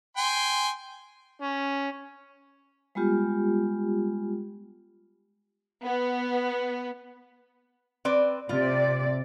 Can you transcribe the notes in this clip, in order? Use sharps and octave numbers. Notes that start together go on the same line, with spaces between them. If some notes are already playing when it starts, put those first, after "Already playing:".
G5 G#5 C6
C#4
G3 G#3 B3 F4 G4
B3
C4 B4 D5
C3 F4 D5